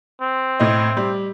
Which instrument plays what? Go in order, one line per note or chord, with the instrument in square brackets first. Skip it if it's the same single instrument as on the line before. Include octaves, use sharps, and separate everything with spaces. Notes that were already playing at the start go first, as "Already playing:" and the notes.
[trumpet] C4
[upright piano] A2 D#5
G3